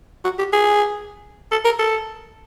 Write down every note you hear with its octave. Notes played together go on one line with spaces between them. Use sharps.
F#4
G4
G#4
A4
A#4
A4